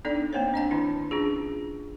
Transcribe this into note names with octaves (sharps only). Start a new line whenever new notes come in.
B3 D4 D#4 A4 D5
A#3 C4 C5 C#5
D4 D#5 A5
D#3 D4 E4
C#4 D4 F4 G#4